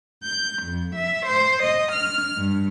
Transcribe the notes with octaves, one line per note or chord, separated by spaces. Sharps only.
G6
F2
E5
C5
D#5
F6
G2